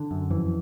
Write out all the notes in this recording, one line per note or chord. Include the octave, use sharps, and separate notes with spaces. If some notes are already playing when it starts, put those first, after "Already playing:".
Already playing: D3
F#2
F2 E3